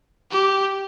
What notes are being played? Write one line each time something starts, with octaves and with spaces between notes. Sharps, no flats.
G4